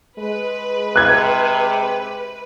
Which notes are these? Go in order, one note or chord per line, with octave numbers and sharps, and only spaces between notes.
G#3 B4
C3 F#6 G#6